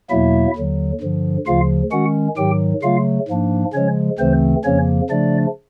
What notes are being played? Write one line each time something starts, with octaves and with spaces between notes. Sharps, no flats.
E2 B2 F#3 A#3 E4 E5
D#2 D3 F#3
G2 D3 F3
D2 C#3 F3 F4 F5
D#3 G#3 C#4 F#4 F#5
G#2 D#3 F#3 G4 G5
C#3 F#3 A3 F4 F5
G#2 F3 A#3 D4
C#3 F3 G#3 C#4 C#5
D2 C#3 E3 A3 C4 C5
F2 C#3 F3 A#3 C#4 C#5
C#3 F3 A3 D4 D5